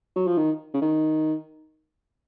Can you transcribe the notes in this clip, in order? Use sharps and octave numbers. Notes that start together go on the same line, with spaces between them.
F#3
F3
D#3
C#3
D#3